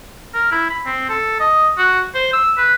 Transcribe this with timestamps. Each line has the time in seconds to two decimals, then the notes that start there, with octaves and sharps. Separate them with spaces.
0.34 A#4
0.51 E4
0.70 B5
0.86 C4
1.09 A4
1.40 D#5
1.78 F#4
2.14 C5
2.33 E6
2.58 B4